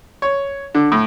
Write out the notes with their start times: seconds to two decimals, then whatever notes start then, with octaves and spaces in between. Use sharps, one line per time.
0.22 C#5
0.75 D3
0.92 A2